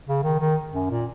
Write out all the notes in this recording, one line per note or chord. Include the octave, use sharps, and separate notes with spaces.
C#3
D#3
D#3
F#2
A#2